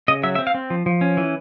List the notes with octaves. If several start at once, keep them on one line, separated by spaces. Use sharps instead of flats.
C#3 D#5
F#3 E5
E5
C4
F5
C4
F3
F3
C#4
E3